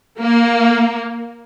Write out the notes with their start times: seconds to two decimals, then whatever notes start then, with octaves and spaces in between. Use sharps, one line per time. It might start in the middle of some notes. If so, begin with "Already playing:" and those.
0.19 A#3